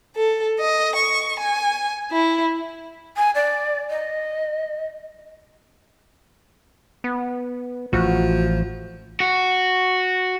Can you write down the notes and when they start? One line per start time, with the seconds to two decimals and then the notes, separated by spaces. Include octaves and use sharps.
0.16 A4
0.59 D#5
0.96 C#6
1.39 G#5
2.11 E4
3.17 G#5
3.35 D5
3.90 D#5
7.04 B3
7.93 A1 F3 F#4
9.20 F#4